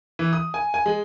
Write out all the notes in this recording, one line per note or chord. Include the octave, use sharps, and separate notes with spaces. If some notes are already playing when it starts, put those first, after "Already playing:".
E3
D#6
G#5
G#5
G#3